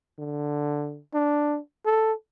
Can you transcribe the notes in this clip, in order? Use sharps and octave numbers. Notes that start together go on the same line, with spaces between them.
D3
D4
A4